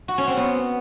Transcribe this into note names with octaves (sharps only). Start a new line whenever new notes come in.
F#4
C#4
C4
B3